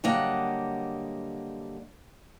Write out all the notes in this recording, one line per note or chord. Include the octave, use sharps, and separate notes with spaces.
D3 F#3 G3 A#3 D#5 F#5